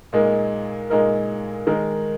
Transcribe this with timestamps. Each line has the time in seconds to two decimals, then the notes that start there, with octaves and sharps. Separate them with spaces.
0.13 A#2 G#3 D#4 A#4
0.90 A#2 G#3 D#4 A#4
1.67 D#3 G#3 D#4 A#4